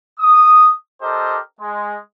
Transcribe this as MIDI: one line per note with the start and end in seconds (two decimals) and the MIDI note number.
0.20 0.72 87
1.02 1.38 62
1.02 1.38 67
1.02 1.38 69
1.02 1.38 70
1.02 1.38 72
1.02 1.38 75
1.61 1.97 56